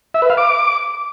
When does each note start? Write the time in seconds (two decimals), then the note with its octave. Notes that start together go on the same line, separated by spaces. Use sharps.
0.14 E5
0.22 B4
0.30 F5
0.37 D6